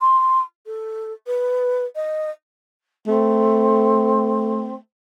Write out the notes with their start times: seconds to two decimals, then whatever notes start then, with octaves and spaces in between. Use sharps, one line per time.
0.01 C6
0.66 A4
1.27 B4
1.96 D#5
3.07 A3 C4